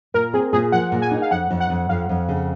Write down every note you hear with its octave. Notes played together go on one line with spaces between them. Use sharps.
A#2 A#4
C4 G#4
A#2 G#4
F3 F#5
A#2
G#5
D#4
F5
F2 F#5
F2
F#5
F2
F2 F5
F2
C#3